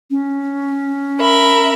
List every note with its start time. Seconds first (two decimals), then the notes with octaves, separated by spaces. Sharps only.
0.10 C#4
1.20 A#4 E5 B5